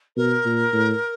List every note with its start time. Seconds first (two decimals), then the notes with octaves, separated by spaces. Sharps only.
0.17 B2 A#4
0.45 A#2
0.73 A2